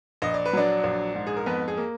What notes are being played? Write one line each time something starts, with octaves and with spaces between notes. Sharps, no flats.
A#1 D#5
D5
B4
F#3 D4 D5
A#1
G#2
G#4
A#4
F2 B3 B4
G#4
A#3